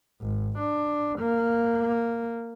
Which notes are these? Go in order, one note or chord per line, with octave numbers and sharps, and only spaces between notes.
G#1
D4
A#3